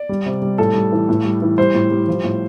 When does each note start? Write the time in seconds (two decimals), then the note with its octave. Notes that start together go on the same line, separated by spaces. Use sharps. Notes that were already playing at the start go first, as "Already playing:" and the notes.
Already playing: D5
0.09 G3
0.26 C3
0.42 G3
0.58 A2 A4
0.75 G3
0.92 E3
1.09 A2
1.24 G3
1.42 E3
1.58 G3 C5
1.74 A2
1.91 G3
2.08 F3
2.24 A2